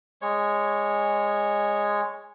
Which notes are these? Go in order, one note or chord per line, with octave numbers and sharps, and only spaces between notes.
G#3 C#5